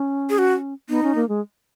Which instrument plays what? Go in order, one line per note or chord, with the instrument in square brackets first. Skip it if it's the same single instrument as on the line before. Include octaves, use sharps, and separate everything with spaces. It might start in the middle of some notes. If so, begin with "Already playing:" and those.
Already playing: [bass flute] C#4
[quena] G#4
F#4
[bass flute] B3 [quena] D#4
[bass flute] C#4
A#3
G#3